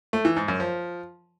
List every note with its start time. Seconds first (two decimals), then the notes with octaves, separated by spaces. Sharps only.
0.13 A3
0.25 E3
0.36 G#2
0.48 F#2
0.60 F3